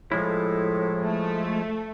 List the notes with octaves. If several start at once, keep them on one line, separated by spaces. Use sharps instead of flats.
A2 F3 G#3 E4
A3